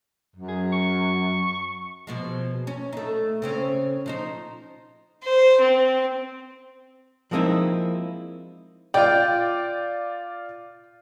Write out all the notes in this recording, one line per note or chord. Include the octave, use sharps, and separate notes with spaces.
F#2
G#4
C#6
B2 F3 G#3
C#4
A3 D#4
C#3 C4 C#4
F3 D#4 C5
C5
C4
F3 G#3 A#3 C4 D#4 E4
F4 D5 G5